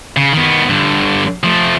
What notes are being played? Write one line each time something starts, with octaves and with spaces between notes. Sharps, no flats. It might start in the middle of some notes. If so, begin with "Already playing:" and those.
C#3
D#3 B3
G2 D3
F3 A3